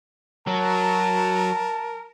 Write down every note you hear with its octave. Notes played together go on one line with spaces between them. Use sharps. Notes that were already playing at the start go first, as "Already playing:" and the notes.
F#3 A#4 A5